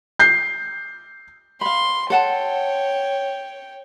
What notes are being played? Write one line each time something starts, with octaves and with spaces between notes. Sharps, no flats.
G6 C7
F5 B5 C6
A4 C#5 F#5 G5 A5